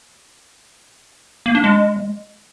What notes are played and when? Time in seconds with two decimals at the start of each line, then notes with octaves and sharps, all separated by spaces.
1.46 A#3
1.55 D4
1.64 G#3